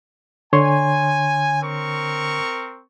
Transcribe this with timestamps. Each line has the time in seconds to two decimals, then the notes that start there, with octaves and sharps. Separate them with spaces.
0.53 D3 C#5 G#5 C6
1.62 C4 A#4 C#6